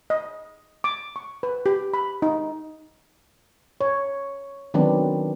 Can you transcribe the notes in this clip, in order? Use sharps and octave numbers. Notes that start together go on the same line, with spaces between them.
D#5
D6
C#6
B4
G4
B5
D#4
C#5
D#3 F#3 B3 C4 D4